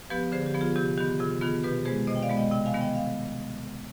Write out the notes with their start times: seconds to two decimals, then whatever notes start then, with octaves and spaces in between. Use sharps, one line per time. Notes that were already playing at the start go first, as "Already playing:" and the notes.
0.10 F3 B3 G4 B4
0.32 D3 G#4 C5
0.46 G4
0.54 F3 B3
0.61 F4 G#4
0.76 C3 G4
0.98 D#3 B3 G4
1.19 C3 F4 G#4
1.41 D#3 B3 F4 G#4
1.63 B2 G4 B4
1.85 G#3 B3 G#4 C5
2.07 B2 C5 D#5
2.15 G5
2.22 D5 F5
2.29 G#3 B3
2.37 D#5 G5
2.52 C3 D#5 G5
2.66 F5 G#5
2.73 D#3 G3 B3
2.81 D#5 G5
2.95 F5